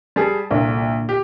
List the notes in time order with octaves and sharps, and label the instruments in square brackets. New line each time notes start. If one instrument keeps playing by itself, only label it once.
[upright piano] G3 G#4 [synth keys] A5
[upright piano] C2 [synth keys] A#2 D3
[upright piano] G4